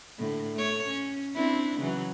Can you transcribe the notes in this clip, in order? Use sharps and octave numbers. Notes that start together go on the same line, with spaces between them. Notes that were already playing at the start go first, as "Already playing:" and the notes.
A2 D3
A3 C#5
C#4
C4 D4 E4
C#3 E3 F#3